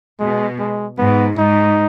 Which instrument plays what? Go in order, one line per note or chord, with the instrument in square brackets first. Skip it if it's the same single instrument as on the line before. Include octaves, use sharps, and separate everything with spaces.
[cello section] B2 [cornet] G#3
[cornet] G#3
[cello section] G#2 [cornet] B3
[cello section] G#2 [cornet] D#4